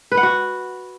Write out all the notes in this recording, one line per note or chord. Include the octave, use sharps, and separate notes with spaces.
B4
F#5
F#4